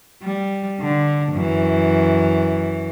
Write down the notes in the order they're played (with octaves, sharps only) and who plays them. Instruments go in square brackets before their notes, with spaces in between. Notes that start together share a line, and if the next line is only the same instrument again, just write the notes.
[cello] G3
D3
F#2 E3